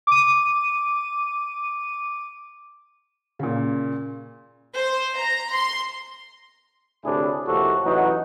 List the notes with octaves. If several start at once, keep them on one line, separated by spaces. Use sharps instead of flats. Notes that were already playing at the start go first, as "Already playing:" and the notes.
D6 D#7
A#2 C#3
C5
A#5
C6
D2 A2 C3 D4 E4 G#4
F2 A2 C3 A#3 F#4 A4
A1 E3 F#3 D#4 F#4